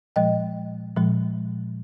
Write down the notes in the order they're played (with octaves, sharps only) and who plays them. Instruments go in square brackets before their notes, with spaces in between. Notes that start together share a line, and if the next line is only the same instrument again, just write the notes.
[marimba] A#2 F3 G#3 D#5 G5
A#2 F3 G#3